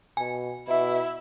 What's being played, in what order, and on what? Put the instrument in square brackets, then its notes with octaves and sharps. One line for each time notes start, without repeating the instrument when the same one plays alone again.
[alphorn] B2 [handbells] G#5
[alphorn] B2 [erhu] E4 [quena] E5